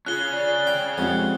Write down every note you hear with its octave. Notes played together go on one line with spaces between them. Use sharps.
C#4 F4 G#4 F#6 G7
D5
G5
F2 G3 G#3 F#5